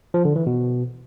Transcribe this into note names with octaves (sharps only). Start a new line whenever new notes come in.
F3
D3
E3
B2